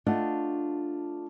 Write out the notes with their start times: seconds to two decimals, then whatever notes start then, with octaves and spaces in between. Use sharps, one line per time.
0.06 A3 D4 F4 D#5 F#5